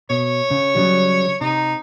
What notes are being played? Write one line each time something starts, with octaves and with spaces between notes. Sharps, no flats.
B2 C#5
C#3
C#3 F#3 G3
C3 D#4